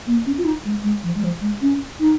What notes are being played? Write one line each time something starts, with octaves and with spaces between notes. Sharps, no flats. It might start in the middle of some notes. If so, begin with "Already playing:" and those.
A#3
C#4
F4
D#4
G#3
G#3
F3
G#3
F3
G#3
C#4
D#4